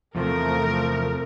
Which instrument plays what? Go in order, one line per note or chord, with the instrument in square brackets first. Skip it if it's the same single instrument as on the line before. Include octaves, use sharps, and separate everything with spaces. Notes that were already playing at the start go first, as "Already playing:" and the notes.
[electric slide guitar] E2 C3 [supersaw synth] F3 A3 [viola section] A#4